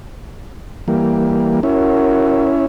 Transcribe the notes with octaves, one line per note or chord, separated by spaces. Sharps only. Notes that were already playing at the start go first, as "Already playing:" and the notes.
E3 G3 A#3
C#4 E4 F#4 A#4